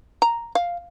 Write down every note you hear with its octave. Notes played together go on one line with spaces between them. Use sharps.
A#5
F5